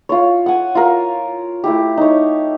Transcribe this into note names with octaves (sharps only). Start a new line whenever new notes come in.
F4 C#5
F#5 G#5
F4 A#4
A3 E4 G4
D#4 C#5